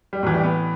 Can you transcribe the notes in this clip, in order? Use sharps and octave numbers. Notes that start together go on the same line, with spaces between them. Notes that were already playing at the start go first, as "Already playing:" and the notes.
G3
A2 E3 F#3
G3
B3